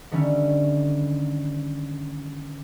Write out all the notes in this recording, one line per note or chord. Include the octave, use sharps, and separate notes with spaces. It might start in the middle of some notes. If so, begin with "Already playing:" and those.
D3 D#3 G3 A3 C#4